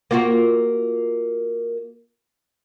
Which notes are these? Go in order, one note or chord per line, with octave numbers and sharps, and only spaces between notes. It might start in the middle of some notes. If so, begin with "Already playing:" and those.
A#3 F4 F#4